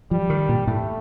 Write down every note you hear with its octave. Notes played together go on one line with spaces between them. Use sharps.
F3 G3
D#3
A#2
A2 A3